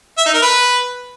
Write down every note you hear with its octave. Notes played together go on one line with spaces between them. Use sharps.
E5
D#4
A#4
B4